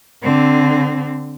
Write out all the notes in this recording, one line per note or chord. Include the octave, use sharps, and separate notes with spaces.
D3 C4